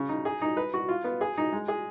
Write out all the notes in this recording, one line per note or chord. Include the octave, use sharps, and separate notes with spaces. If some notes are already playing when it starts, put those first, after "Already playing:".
Already playing: C#3
D#4
G#4
D#4
B4
F#4
F4
B3
G#4
D#4
G#3
G#4